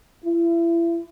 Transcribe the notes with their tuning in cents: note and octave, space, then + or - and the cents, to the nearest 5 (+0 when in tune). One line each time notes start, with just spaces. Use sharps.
E4 +35